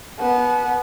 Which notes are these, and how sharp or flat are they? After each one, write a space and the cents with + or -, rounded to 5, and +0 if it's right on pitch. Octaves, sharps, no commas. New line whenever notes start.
B3 -10 A5 -40